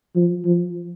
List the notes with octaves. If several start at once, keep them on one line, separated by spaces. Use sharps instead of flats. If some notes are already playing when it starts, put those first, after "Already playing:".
F3
F3